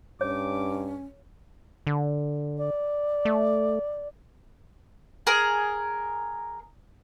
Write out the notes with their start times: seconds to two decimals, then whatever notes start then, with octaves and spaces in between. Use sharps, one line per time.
0.21 G2 C#4 C#5 D6
1.87 D3
2.58 D5
3.25 A3
5.27 G#4 A#4